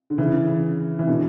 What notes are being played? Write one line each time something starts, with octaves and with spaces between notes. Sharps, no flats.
D3
C#3 E3
E3
B2 D3